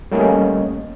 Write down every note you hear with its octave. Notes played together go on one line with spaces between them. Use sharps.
G3 A3 A#3 C#4 D#5